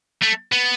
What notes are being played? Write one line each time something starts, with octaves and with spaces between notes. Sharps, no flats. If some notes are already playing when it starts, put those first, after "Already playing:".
A3
B3